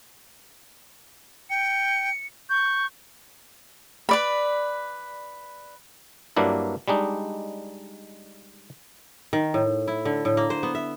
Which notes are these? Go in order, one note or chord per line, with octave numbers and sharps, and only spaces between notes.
G5 C#7
C#6 G6
B4 D5 B5
G2 F#3 A#3 D4 E4
G3 G#3 D4 D#4
D#3
A2
E4
D3
A2
A#3
C5
B3
E5